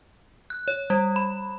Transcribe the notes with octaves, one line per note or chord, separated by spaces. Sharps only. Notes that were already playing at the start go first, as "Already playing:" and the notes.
F#6
C#5
G3
B5